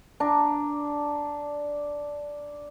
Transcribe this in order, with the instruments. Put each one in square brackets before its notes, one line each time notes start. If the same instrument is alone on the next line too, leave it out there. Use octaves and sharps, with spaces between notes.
[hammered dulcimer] D4 A#5